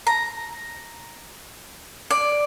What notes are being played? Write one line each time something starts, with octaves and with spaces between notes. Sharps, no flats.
A#5
D5